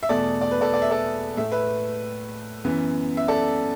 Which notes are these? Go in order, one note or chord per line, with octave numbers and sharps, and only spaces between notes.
E5
E2 B2 A3 A4 D5
D5
B4
A4 D5
D5
E5
A4 D5
A2 A3 E5
B4 E5
F#2 E3 B3
E5
A4 D5